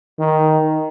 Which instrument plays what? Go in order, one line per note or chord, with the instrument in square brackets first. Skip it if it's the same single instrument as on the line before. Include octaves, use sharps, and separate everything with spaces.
[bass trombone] D#3